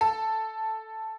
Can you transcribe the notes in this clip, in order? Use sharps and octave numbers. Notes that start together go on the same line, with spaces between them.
A4